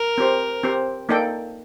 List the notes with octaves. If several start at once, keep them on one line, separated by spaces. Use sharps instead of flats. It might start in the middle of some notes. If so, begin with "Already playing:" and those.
Already playing: A#4
C4 G4 C5
C4 G4 C5
A#3 D#4 A4 D5 G5